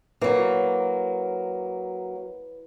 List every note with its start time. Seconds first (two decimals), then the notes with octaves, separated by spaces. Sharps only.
0.22 F#3 A#3 E4 B4